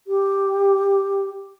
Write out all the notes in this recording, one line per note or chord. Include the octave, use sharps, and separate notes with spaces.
G4